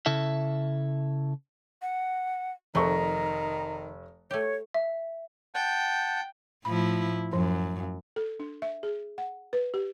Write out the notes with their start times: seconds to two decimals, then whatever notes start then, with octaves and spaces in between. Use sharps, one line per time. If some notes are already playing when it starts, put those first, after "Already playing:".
0.06 C#3 E4 A4 E5
1.82 F#5
2.75 F1 D#3 F3 A3 A#5 C#6
4.31 A3 G4 C#5
4.74 E5
5.55 F#5 G5 A5 G6
6.65 A2 F3 E4 B5
7.33 F#2 F3
8.16 A4
8.40 D4
8.62 E5
8.83 G#4
9.18 F#5
9.53 B4
9.74 G4